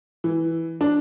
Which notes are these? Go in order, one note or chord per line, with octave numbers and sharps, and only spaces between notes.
E3
D4